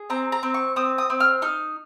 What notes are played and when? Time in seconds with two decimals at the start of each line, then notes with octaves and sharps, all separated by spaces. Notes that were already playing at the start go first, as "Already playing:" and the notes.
Already playing: G#4
0.10 C4 A#5
0.32 A#5
0.43 C4
0.54 C#6
0.76 C4 D#6
0.98 D#6
1.10 C4
1.20 F6
1.42 D#4 F6